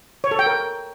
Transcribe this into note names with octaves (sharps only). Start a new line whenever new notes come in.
C#5
A4
G5
A#4